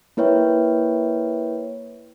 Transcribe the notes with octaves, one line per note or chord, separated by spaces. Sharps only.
A#3 E4 B4 C#5 E5 G5